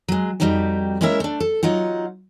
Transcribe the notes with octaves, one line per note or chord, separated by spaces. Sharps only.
F#3 G#3
F2 C3 G3 D#4 F#4 G4
G#3 A#3 C#4 E4 A#4 E5
A3 D4
A4
F#3 D#4 F4 F#5